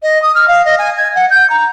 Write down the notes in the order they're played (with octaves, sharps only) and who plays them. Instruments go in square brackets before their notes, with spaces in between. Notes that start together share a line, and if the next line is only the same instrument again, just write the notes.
[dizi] D#5
D#6
F6
F5
D#5
G#5
G#6
F#5
G6
A#5